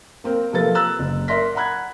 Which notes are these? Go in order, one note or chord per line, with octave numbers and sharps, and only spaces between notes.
A#3 C4 A#4
C3 F3 A#3 A4 B4 A6
A#5 E6 F#6 A6
F#1
A#4 D5 E5 C6 A#6 B6
F#5 A#5 B5 F#6 G#6